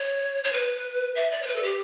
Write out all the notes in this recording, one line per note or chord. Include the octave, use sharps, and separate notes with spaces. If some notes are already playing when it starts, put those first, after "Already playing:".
Already playing: C#5
C#5
B4
E5
D5
C#5
B4
A4
G4